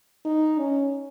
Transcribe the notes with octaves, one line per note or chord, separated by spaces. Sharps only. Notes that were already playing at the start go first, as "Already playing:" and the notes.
D#4
C#4